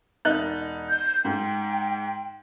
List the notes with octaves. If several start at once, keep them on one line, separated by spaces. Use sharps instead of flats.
E1 D#4 F#6
G6
G#2 G5